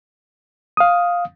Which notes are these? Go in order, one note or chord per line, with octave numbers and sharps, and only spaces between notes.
F5 D#6